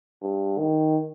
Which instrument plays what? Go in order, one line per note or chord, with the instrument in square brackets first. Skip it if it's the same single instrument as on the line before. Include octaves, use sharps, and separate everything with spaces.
[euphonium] G2
D#3